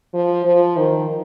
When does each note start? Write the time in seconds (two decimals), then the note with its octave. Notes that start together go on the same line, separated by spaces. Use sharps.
0.13 F3
0.45 F3
0.76 D#3